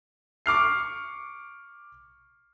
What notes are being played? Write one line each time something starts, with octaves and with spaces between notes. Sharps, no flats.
C#6 D6 F6 C7